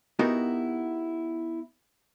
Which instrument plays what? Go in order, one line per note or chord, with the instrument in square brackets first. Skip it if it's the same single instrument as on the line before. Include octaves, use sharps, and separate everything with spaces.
[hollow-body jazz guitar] B3 D#4 E4 F#4 G4 A#4